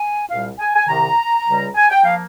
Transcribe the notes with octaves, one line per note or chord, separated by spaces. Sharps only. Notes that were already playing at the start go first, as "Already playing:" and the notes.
Already playing: G#5
C2 A#2 G3 F5
G#5
G#5
C2 C3 D#3 A#5
C#2 C#3 G3
G#5
G5
F3 A#3 F5